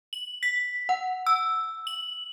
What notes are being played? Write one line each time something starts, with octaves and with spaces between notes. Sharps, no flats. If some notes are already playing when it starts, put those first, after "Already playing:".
F#7
B6
F#5
E6
F#7